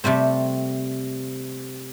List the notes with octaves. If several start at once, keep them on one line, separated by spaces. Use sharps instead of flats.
C3 G3 A3 C4